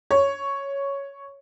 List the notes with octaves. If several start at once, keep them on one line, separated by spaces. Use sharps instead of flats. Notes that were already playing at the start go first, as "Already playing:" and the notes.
C#5